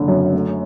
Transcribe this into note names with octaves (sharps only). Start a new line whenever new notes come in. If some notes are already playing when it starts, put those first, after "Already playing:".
Already playing: F#1 D3
F#2
A3